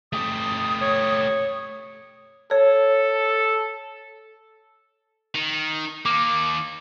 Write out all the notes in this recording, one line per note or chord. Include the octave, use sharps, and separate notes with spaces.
A3 G4 D#6
C#5
A4 C#5
D#3
D#3 A#3 D6